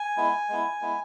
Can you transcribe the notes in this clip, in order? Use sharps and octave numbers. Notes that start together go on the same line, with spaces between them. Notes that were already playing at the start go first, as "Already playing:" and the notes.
Already playing: G#5
G#3 B3 E4
G#3 B3 E4
G#3 B3 E4